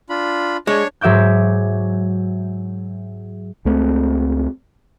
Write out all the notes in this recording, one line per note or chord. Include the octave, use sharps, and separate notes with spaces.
D4 F4 B5
G#3 D4 C#5 C#6
G#2 F#3 E5 D6 G6
C#2 A3 C4